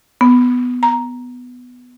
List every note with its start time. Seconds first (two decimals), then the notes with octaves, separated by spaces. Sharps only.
0.21 B3
0.83 A#5